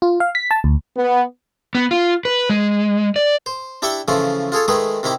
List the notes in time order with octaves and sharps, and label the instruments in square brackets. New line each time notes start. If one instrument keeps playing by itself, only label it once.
[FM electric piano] F4
F5
B6
A5
D2
[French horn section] B3
[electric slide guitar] B3
F4
B4
G#3
D5
[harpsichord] C5
D4 E4 G4 E5 G5 C#6
C#3 E3 F3 A3 F4
F4 G#4 A4 C#5
D#3 G#3 A3 G#4 B4
C3 D#3 E4 G4